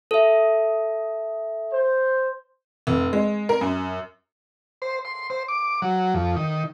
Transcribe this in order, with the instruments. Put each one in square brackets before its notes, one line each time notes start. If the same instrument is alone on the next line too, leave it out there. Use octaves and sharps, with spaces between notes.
[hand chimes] A4 E5
[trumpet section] C5
[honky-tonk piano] F1
G#3
A#4
F#2
[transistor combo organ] C5
C6
C5
D6
F#3
F2
D#3